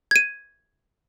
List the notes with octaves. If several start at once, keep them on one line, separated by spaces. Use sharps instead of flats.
G#6 D#7